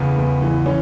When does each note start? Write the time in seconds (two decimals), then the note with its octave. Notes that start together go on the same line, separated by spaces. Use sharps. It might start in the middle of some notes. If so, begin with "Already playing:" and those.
Already playing: E2 C#3 B3
0.18 E2
0.42 E3
0.66 E3 C#4